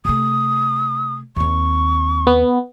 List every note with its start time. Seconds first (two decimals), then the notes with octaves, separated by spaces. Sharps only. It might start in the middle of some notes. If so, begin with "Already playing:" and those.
0.05 C3 A3 D#6
1.36 D#2 C4 C#6
2.27 B3